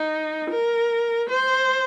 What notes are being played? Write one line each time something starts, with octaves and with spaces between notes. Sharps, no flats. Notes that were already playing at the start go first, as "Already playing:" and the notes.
Already playing: D#4
A#4
C5